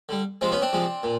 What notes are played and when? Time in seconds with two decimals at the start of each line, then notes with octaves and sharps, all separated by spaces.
0.09 D3 G3
0.41 C3 F3 G#3 C4
0.52 B3 C#4
0.62 C4 D4
0.73 C3 F3 G#3
1.03 A#2